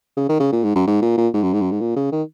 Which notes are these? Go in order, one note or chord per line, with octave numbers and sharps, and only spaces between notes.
C#3
D#3
C#3
A#2
G#2
F#2
G#2
A#2
A#2
G#2
F#2
G#2
F#2
G#2
A#2
C#3
D#3